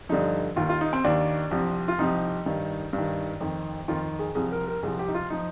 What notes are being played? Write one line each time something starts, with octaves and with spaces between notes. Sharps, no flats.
G2 D3 F3 D#4
D#2 D#3 F4
F4
D#4
C4
D#2 D#3 D4
C2 C3 F3
F4
C2 C3 F3 D#4
G2 D#3
G2
D#3
F2 D#3
F2 D#3 F4
G#4
C2 C3 F3 G#4
A#4
A#4
C2 C3 F3 G#4
G4
D#4
F4
F3 D#4